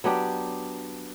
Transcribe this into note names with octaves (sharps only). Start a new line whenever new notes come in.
F#3 B3 D4 G4